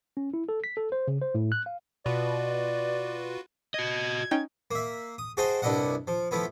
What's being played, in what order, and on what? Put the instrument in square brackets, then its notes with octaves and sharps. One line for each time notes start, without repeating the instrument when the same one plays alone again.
[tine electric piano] C#4
E4
A4
B6
A4
C5
C#3
C5
A2
F#6
F5
[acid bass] B2 [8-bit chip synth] F4 F#4 B4 [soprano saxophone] D5
[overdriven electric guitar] F#4 D#5 [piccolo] G#6
[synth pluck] C#4 D#4 G5
[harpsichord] A#3 E5
D#6
F#4 G#4 A4 C5 D#5 G5
C2 G2 D4 E4 D#5 F#5
F3
F3 A3 B3 E4